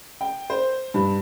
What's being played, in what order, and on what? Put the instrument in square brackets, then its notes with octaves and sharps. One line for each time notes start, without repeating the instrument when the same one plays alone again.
[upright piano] G5
C5
G2